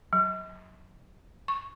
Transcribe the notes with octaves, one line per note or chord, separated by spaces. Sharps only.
F#3
C#6